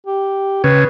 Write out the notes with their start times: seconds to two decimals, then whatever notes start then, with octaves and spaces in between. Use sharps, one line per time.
0.07 G4
0.64 C#3 B4